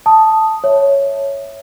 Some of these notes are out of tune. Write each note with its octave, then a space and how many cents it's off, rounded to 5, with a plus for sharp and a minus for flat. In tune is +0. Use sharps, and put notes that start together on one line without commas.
A5 +0 D#6 +0
C#5 +0 E5 +0